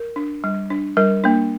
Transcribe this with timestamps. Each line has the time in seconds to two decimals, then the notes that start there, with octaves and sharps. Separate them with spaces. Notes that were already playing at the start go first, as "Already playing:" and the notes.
Already playing: A#4
0.16 D4
0.44 G3
0.70 D4
0.97 G3 A#4
1.24 A#3 D4